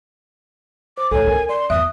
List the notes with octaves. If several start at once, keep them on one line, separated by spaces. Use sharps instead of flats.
C5 D6
D1 D2 A4 C#5 G#5
C#4 A#4
D5 C6
E2 E5 D#6 F#6